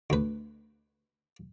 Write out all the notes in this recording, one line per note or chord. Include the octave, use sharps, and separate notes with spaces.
D2 B4